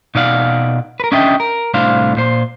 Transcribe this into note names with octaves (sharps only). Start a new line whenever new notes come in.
B2 D#4 D5 F5 F#5
A#4 B4
C#4 D4 D#5 E5 G5
A#4
C2 A2 D4 C5 F5
A#2 C5